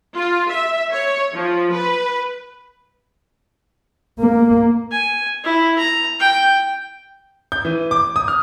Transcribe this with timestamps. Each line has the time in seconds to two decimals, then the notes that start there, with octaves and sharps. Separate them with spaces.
0.16 F4
0.51 E5
0.92 C#5
1.35 F3
1.74 B4
4.19 A#3
4.91 G#5
5.44 E4
5.78 A#5
6.20 G5
7.52 G6
7.65 E3
7.91 D6
8.16 D#6
8.28 F6